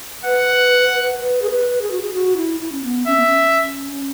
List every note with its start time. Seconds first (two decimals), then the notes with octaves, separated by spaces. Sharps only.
0.24 B4 F#5
1.19 B4
1.42 G#4
1.50 B4
1.82 G#4
1.92 F#4
2.02 G#4
2.13 F#4
2.37 E4
2.60 E4
2.72 C#4
2.83 B3
3.07 C#4 E5
3.17 B3
3.27 C#4